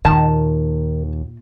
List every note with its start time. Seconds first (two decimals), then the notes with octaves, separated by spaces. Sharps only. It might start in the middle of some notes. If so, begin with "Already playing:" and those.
0.05 D#2 A#2 D#3 A5